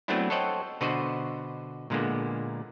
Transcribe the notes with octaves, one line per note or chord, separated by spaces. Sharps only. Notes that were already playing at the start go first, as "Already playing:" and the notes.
F#3 A3 B3 C4 D4 E4
A4 C5 C#5 D#5 F#5 G5
B2 D3 F#4 B4 C5 D#5
A#2 D3 G#3 A#3 B3